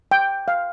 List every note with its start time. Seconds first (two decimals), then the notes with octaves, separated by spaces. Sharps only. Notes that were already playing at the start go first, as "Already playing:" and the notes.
0.11 G5
0.48 F5